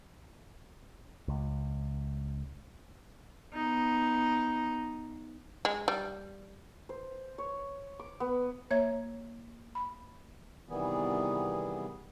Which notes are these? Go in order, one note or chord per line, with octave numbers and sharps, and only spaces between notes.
C#2
B3 D#4
G#3
G3
C5
C#5
D6
B3
A#3 C#5 E5 G#6
B5
C3 D#3 E3 G3 B3 G#4